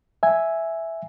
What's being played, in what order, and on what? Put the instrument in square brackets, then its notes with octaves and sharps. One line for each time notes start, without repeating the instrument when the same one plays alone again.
[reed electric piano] E5 G#5